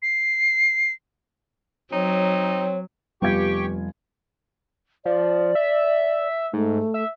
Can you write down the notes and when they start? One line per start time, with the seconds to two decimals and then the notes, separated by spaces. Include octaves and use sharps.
0.02 C7
1.93 F#3 C4 D#4 C#5
3.22 F1 G3 B3 F4 G4 G5 C#6 G#6
5.05 F3 D5
5.55 E5
6.53 G#2 A3
6.94 E5